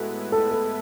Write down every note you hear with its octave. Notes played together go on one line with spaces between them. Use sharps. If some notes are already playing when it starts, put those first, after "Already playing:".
Already playing: A2 G#3 B3 E4 F#4 A4 B4
A4
A4